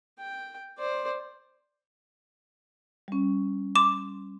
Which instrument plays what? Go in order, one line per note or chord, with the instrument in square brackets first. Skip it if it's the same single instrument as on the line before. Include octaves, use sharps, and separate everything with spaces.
[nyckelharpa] G5
C5 D5
[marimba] G3 C#4
[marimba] C6 [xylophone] D6 E7